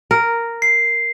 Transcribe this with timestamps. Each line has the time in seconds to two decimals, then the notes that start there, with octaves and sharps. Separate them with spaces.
0.11 A#4
0.62 C7